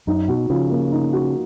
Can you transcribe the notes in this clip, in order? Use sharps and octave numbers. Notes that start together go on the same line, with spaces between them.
F#2 D#4
B2 F#4
C#3 F3
A#3
D#4
F#4